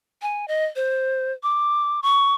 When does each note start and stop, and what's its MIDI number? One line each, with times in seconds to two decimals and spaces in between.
0.22 0.48 80
0.48 0.65 75
0.76 1.33 72
1.43 2.00 86
2.03 2.35 85